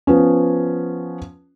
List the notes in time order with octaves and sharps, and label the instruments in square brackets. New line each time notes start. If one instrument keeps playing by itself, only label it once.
[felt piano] F3 B3 C#4